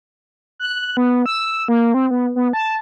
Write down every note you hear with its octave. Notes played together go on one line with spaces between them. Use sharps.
F#6
B3
E6
A#3
C4
B3
B3
A5